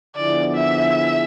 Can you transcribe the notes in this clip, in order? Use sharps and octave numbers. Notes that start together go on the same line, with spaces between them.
D3 F3 B3 E4 G#4 D5
E5